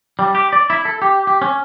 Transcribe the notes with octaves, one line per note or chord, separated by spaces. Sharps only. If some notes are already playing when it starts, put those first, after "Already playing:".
G3
G4
D5
E4
A4
G4
G4
C#4